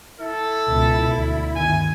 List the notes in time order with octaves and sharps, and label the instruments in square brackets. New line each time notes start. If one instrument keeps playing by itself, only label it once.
[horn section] E4 [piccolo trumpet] A4
[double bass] C#2 B2
D2
[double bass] G1 D#3 [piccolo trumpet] G#5